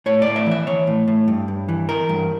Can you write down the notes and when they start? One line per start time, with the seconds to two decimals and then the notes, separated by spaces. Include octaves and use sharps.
0.06 A2 C#5
0.22 D5
0.27 A2
0.36 E5
0.46 E3 E5
0.67 E3 C#5
0.87 A2
1.08 A2
1.28 G2
1.48 G2
1.68 E3
1.89 E3 A#4
2.09 G2